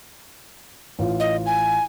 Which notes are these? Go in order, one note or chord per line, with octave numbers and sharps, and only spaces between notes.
A1 F4
D#5
G#5